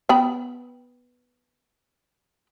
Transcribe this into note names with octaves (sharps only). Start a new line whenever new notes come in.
B3 G5 B5